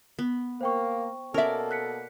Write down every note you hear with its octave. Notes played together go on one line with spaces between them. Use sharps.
B3
A#3 C5 G5 C#6
B2 A#3 C#4 A4 A#4 D5 E5
F#6 B6 C#7